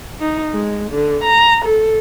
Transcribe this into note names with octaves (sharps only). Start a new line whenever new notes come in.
D#4
G#3
D3
A#5
A4